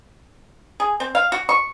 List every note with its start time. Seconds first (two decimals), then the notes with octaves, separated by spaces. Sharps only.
0.80 G#4
1.00 C4
1.15 F5
1.32 F#4
1.49 C#6